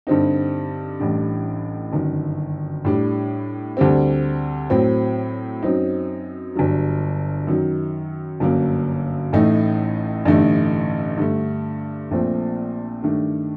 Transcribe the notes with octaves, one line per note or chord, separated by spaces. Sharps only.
G2 D3 G3 C4 D#4
A1 A2 G3 D4
G1 F#2 D#3
A2 G3 D4
D2 D3 G3 C4
A2 F#3 C4
F#2 F#3 C4 D#4
G1 G2 F#3
F#2 D#3 F#3
G1 F#2 F#3 A#3
A1 A2 A3 D#4
A1 G2 D3 A3 D#4
G2 D3 A3
A#1 A#2 A3 C4
G2 D#3 A3 D4